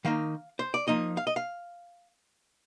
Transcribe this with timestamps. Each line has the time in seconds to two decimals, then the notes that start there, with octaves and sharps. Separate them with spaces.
0.05 D#3 A#3 D#4 F5
0.59 C5
0.74 D5
0.87 F3 A#3 D#4 D#5
1.17 F5
1.27 D#5
1.36 F5